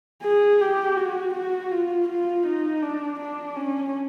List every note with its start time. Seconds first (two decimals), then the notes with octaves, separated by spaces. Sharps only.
0.23 G#4
0.61 G4
0.97 F#4
1.34 F#4
1.71 F4
2.08 F4
2.46 D#4
2.82 D4
3.20 D4
3.56 C#4